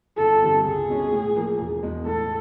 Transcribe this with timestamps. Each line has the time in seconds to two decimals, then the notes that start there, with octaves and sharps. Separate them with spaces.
0.17 G1 A4
0.41 G2 D3 G3 C4
0.65 C#2 G#4
0.88 B2 G#3 C#4
1.11 A2
1.36 F3 A#3
1.59 E1
1.83 E2 B2 G#3
2.06 A2 A4